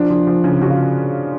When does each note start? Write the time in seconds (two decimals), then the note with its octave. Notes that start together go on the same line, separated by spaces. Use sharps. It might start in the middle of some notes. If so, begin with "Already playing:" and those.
Already playing: F3 D4
0.10 F3
0.27 F3
0.44 C#3
0.61 C#3 F#4
0.70 F4